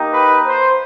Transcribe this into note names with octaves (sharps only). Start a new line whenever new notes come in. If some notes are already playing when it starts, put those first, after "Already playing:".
Already playing: A#3 D#4 G4
B4
C5